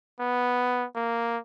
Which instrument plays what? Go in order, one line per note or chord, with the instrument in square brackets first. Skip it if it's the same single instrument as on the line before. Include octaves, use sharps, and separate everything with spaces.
[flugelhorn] B3
A#3